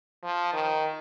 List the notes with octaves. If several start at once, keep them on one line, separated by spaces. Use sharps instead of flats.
F3
D#3